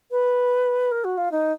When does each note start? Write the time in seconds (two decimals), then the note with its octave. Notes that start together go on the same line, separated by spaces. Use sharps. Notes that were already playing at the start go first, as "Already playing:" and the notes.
0.11 B4
0.91 A#4
1.04 F#4
1.17 F4
1.31 D#4